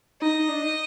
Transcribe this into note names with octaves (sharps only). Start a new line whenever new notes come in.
D#4 D#5
D#4
D4
D#4